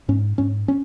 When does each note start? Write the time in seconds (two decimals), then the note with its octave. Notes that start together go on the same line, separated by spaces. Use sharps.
0.08 G#2 C#4
0.38 G#2 C#4
0.68 C#4